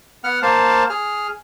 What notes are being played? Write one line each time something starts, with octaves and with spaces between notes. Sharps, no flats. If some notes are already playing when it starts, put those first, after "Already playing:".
B3 F#5 F6
A#3 C5 F5 A5
G#4 F6